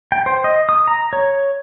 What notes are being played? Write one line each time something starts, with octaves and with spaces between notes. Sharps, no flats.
G5
C5
D#5
D#6
A#5
C#5